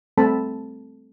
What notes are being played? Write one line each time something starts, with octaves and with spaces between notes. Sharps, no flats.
G3 A3 C4 A4 A5 B5